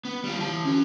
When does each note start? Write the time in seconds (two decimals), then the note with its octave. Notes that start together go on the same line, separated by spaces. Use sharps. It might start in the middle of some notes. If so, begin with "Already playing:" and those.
0.05 B3
0.24 G3 F4
0.39 E3 A5
0.65 C#4 F#4